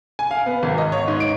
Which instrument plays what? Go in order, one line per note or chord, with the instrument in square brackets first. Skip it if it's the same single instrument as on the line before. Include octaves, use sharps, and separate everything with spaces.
[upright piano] G#5
F5
B3
G#1
D#5
C#5
G#2
D7